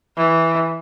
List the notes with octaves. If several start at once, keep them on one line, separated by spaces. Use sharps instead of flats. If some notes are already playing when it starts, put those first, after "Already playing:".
E3